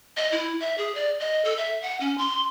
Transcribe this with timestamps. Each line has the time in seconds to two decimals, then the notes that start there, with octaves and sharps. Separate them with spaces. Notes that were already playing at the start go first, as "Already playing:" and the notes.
0.17 D#5
0.32 E4
0.60 E5
0.78 G#4
0.95 D5
1.20 D#5
1.45 A4
1.58 E5
1.82 F#5
2.00 C#4
2.18 C6